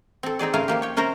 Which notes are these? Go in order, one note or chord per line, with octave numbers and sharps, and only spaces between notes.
C4 A4
C4 D#4 G#4 D5
C#3 A3 F4 A#4 G#5 A#5
C#3 F3 A#3 G4
C#5 G5
C3 C#4 A#4 C5 A#5